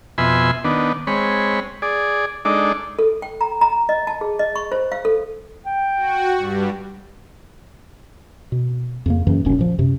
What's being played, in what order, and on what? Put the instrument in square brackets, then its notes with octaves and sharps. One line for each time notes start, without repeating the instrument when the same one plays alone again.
[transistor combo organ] F2 B2 E5 G#5 B5 C6
D#3 B3 D4
G#3 C4 C#5 B5
G#4 D5
G#3 D4 D#4 A4 D5
[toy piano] A4
G5
A#5
A#5
D#5
A5
G#4
D#5
C#6
C5
F5
A4
[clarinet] G5
[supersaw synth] F#4
G2 G3
[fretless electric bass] B2
F2 C#3 A#3
F#2 C#3 E3
F1 B1 F#2 C#4
A#2 F3
F#2 C3